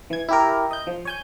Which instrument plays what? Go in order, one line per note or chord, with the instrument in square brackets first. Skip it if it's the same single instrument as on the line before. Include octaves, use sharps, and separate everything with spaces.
[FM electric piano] E3 G#6
E4 G4 A#4
D#5 G6
F3
C#5 G#5 G6